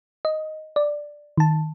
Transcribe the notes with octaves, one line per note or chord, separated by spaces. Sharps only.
D#5
D5
D#3 A5